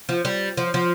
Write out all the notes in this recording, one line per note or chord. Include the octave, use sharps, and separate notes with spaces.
F3
G3
F3
F3